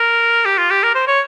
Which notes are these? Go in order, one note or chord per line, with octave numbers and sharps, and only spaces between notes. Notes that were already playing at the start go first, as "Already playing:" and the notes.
Already playing: A#4
G4
F4
G4
A#4
C5
C#5